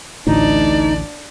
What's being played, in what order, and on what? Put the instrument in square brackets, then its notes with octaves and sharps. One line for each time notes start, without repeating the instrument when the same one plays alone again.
[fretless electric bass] A1 D2 A2 [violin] D4 D5 [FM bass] D#4